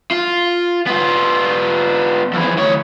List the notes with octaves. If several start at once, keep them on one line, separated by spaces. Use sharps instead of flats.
F4
B3 F4
F2 E3
D2 C#5